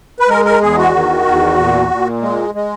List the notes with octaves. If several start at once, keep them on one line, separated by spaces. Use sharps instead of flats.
B4
G#3 A#4
A#4
E2 G#4
F#4
D#3
E2
A#2
A#2
G#3
G#3